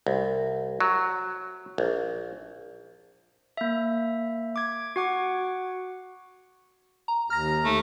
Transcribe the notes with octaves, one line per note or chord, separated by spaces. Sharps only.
C2
F#3
A#1
A#3 E5
D6 G#6
F#4 F#5 D6
A#5
D#2 A#5 F6 A#6
A3